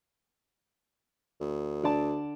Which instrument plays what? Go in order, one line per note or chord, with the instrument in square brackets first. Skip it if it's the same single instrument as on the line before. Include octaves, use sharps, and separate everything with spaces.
[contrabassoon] D2
[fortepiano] D3 D5 A5